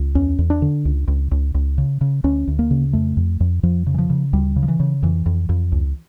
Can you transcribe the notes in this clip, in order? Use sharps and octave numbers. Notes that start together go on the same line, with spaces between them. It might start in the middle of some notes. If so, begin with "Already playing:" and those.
Already playing: C#2
E2 C#4
E2
D4
D3
C#2
C#2
C#2
C#2
C#3
C#3
D2 C#4
D2
A#3
C#3
F2 A3
F2
F2
F2 F3
C#3
E3
F3
C#3
D2 G3
C#3
F3
E3
C#3
F2 E3
F2
F2
C#2